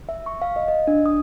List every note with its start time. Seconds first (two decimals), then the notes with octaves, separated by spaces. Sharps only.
0.09 E5
0.26 C#6
0.42 F5
0.56 D#5
0.68 D#5
0.87 D4
1.06 D#6